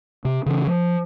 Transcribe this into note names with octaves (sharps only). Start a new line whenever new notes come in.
C3
C#3 E3 C#4
F3